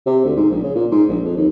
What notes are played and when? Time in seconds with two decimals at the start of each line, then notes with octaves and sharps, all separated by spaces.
0.07 C3
0.25 D2
0.37 G#2
0.50 A#1
0.62 C#3
0.75 A#2
0.91 G#2
1.09 A#1
1.24 F2
1.37 D#2